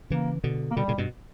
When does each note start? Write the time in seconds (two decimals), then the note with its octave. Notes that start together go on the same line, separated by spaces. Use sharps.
0.10 C#3 E3 A#3
0.44 B2 D3
0.70 A#3
0.76 B2 D3 G3
0.88 A#2 C#3
0.98 G2 B2